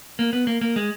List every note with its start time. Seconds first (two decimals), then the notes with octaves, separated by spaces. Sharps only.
0.19 A#3
0.33 B3
0.47 A#3
0.61 A#3
0.76 G#3